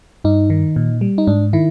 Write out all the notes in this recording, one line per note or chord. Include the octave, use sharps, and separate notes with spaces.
G2 D#4
D#3
A#2
G3
D#4
G#2 D4
D#3 E4